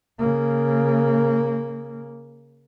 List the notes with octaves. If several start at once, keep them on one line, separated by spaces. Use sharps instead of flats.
C#3 A#3